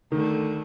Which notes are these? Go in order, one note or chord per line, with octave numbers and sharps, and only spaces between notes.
D2 D3 D#3 A3